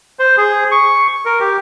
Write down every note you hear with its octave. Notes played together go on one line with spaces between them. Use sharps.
C5
G#4
C#6
A#4
G4